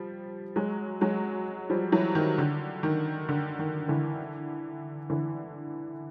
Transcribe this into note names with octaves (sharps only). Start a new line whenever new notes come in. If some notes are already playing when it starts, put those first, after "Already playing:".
Already playing: F3 G3
F#3 G#3
F#3 G#3
F3 G3
E3 F#3
D#3
D3
D#3
D3
D#3
D3 E3
D3 E3